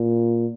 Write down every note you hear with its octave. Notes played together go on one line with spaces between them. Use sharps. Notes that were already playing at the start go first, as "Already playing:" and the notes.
Already playing: A#2